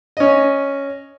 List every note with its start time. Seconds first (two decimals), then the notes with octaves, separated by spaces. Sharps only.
0.17 C#4 D#5